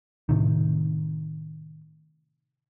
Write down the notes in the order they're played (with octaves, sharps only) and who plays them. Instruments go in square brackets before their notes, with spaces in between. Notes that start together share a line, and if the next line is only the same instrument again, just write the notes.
[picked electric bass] A2 C3 D#3